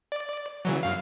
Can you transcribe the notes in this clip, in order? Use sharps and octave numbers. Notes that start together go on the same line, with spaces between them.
D5
C#3 E3 F#3
F#2 F5